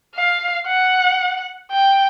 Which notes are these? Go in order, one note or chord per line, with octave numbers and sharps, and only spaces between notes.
F5
F#5
G5